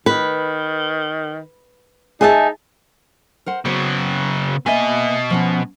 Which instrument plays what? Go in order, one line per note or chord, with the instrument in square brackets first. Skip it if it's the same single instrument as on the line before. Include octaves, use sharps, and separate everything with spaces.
[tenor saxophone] D#3 [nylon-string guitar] B4
[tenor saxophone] D#4 [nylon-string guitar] G#4 E5 A5
[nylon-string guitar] A#4 C5 F#5
[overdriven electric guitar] C#3 F#3 [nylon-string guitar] B3 C5
[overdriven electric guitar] B2 D#5 [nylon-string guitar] A#3 E5 G#5
[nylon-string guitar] F3 B3 C#4